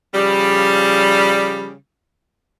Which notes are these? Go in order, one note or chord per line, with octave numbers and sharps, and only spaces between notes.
C#3 F3 G3